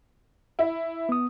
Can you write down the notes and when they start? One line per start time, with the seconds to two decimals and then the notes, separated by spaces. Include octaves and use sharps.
0.59 E4
1.09 B3 D#6